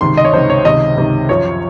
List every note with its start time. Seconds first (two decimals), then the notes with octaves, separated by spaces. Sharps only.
0.01 C#2 C3 D#3 C6
0.17 D#5
0.25 C#5
0.33 C#2 C3 D#3 C5
0.50 C#5
0.64 C#2 C3 D#3 D#5
0.96 C#2 C3 D#3
1.29 F#2 F3 C#5